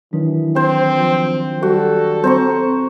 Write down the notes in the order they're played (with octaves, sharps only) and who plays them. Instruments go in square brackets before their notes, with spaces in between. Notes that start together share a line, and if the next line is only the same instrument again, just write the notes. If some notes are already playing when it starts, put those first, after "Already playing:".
[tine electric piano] D#3 F#3 D4 [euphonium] E3
[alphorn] C4 [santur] C5
[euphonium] F3
[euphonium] G3 [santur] F#4 [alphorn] A4
[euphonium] C4 [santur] C5 A#5 C#6